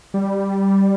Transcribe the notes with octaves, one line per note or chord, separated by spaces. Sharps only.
G3